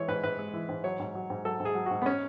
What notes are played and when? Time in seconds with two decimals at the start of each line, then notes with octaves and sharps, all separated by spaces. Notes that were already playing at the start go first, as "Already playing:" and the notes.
Already playing: E3 G#3 C#5
0.08 G#2 B4
0.23 G#2 B4
0.39 G#3
0.53 E3
0.69 G#2
0.84 F#3 C#5
0.99 G#2
1.15 F#3
1.30 G#2
1.45 F#3 A4
1.60 G#2
1.65 G#4
1.75 F#3
1.86 G#2 F#4
2.02 B3
2.06 C#4